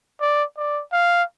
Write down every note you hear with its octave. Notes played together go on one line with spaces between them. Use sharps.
D5
D5
F5